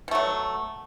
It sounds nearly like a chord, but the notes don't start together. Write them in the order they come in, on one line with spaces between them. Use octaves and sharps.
B2 A3 F#3